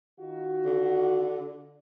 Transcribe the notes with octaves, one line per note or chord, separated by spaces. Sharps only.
D#3 F4 F#4
D3